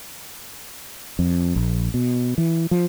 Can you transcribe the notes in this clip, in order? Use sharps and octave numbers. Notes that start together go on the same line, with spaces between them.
F2
A#1
B2
E3
F3